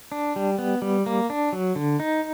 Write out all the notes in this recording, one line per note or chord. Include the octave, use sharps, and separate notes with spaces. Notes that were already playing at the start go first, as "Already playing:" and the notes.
D4
G3
B3
G3
A#3
D4
F#3
D3
D#4